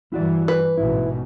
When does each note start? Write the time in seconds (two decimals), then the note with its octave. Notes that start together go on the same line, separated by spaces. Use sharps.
0.12 G2 E3 E4 F#4 D5
0.48 B4
0.77 A1 G#2 B2 E4